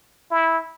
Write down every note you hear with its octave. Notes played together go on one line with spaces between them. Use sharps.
E4